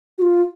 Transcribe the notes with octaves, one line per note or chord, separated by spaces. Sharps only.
F#4
F4